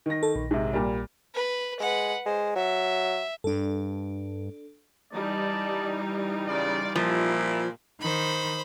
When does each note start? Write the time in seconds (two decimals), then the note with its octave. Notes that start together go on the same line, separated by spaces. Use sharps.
0.06 D#3 A#6
0.23 A4
0.36 A#1
0.51 G#2 C3
0.73 A#2 G3
1.35 B4
1.80 G#3 B4 F#5
2.26 G#3 C5
2.56 F#3 E5
3.44 G2 D4 A4
5.13 E3 G3 D#4 D5 D#5 A5
6.47 C#3 F4 D5
6.96 A#2 F3 E4
8.01 D#3 C5 B5